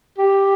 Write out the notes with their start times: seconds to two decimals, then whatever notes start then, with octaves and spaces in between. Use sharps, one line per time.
0.18 G4